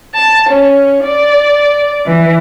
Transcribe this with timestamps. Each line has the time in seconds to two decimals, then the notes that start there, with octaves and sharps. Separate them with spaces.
0.15 A5
0.48 C#4
1.04 D5
2.06 E3